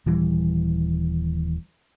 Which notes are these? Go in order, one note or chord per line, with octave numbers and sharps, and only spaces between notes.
D#1 E3 G3